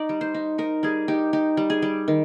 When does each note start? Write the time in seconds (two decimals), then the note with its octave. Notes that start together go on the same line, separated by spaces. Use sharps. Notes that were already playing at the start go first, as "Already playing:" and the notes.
Already playing: D#4 D5
0.09 G3
0.21 C5
0.34 D#4
0.58 D#4 A#4
0.83 G3 G#4
1.08 D#4 G4
1.33 D#4 G4
1.57 G3
1.70 G#4
1.82 G3
2.08 D#3